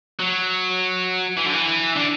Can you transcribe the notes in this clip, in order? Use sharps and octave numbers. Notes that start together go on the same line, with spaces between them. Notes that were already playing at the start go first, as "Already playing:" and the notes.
F#3
E3
D3
E3
D3